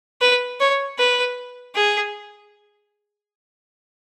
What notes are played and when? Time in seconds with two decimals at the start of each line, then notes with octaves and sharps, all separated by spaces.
0.21 B4
0.60 C#5
0.99 B4
1.75 G#4